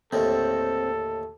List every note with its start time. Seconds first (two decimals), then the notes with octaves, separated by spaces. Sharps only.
0.13 D#2 A2 D3 C4 A4